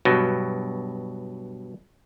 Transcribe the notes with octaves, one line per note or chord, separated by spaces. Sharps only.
G2 B2 F#3